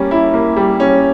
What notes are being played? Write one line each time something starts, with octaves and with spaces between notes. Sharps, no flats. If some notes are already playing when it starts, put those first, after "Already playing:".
Already playing: G3 A#3 C#4
E4
A#3
G3
C#4